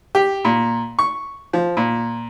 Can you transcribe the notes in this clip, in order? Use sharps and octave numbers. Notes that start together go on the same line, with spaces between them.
G4
A#2
C#6
F3
A#2